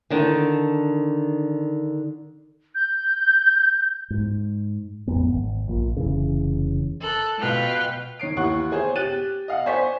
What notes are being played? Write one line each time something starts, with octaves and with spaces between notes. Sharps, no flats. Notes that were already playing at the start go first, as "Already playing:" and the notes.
D3 D#3 D4
G6
G#2
A1 F2 B3
G#1
A#1 A#2
F1 C#3 E3
A4 F#6
B2 F4 B4 G5 F6
D#3 C#5 C7 D7
D#2 E3 F#5 C#6 F#6
G#4 C5 C#5
G4 F#6 A6 D#7
D#5 F5 F#5
C5 D5 G#5 C#6 B6